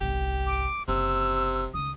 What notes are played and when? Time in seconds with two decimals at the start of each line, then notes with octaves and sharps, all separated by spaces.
0.01 G1 C2 G4
0.47 D6
0.88 F#1 C3 E6
1.74 C#2 D#3 D#6